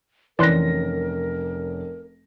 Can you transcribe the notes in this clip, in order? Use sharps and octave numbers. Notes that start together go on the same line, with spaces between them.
F1 E3 C#4 A#4 D5 C6 F#6 A#6